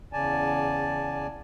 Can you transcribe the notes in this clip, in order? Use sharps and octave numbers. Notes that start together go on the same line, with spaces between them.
E2 C#3 D5 G#5 A5